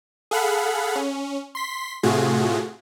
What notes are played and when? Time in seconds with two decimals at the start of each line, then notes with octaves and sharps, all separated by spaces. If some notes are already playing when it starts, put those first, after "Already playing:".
0.31 G#4 A4 F5 F#5 B5
0.95 C#4
1.55 C6 B6
2.03 A2 C3 A3 F4 F#4 G#4